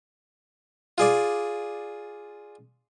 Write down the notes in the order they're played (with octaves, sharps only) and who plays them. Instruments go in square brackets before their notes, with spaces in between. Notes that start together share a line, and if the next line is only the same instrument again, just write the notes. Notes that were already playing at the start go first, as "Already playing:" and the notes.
[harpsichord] F4 G#4 D5